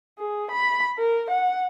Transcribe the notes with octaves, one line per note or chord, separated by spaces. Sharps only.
G#4
B5
A#4
F#5